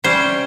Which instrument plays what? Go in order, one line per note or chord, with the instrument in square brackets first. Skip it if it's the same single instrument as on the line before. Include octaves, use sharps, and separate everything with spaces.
[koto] C3 G3 C#4 C5